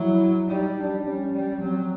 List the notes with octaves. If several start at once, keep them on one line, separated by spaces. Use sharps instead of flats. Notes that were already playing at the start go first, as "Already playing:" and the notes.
Already playing: F#3 E4
G3 D#4
D4
G3 C#4
G3
F#3 C4